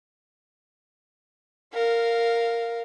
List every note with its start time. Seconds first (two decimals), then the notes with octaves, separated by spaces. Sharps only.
1.74 A#4 F5